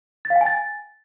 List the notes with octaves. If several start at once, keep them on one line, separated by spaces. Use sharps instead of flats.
A6
F5
G5
G#5
A6